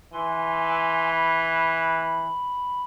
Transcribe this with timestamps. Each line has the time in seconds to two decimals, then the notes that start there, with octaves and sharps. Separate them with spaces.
0.13 E3 G#5 C6
1.12 B5